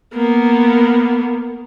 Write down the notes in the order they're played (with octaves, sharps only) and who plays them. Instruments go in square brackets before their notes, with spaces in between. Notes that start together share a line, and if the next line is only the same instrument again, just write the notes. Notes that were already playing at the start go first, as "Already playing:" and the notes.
[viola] A#3 B3